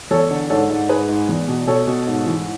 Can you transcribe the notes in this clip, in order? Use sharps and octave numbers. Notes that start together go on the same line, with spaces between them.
E2 A4 C#5
D3
G#2 A4 C#5
G#2
G#2 G#4 B4
G#2
E2
B2
B2 A4 C#5
B2
G#2
E3